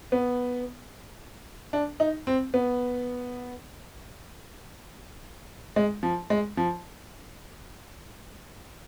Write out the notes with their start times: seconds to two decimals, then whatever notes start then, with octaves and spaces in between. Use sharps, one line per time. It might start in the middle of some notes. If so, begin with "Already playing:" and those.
0.12 B3
1.73 D4
2.00 D#4
2.27 C4
2.54 B3
5.76 G#3
6.03 F3
6.30 G#3
6.57 F3